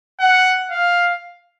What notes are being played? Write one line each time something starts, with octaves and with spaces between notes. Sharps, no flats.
F#5
F5